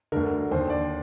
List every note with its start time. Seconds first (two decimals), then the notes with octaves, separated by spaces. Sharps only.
0.12 D2 D3 A#4
0.51 D#2 D3 C5
0.70 D5